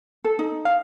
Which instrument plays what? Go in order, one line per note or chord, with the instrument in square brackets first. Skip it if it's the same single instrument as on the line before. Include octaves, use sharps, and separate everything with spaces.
[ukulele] A4
D#4
[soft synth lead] F5